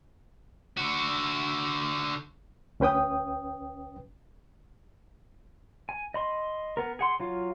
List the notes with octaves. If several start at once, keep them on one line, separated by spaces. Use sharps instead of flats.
D3 F#4
D2 C#4 B4 G5 D#6
G#5
D#5 B5 C6
B3 A#4
G#4 F#5 C6
F#3 F4 F5